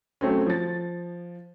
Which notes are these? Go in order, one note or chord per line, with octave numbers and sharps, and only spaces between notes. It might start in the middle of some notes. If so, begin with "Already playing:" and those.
F#3 A3 C4 C#4
F3 A6